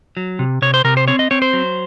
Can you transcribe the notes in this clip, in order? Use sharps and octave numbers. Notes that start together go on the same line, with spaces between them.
F#3
C3
C3 C#5
C5
C3 A#4
C5
C4 C#5
D#5
C4 C#5
C5
F#3